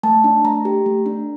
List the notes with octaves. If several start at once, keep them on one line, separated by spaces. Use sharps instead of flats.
A3 A5
D4
A3 A#5
G4
A3
D4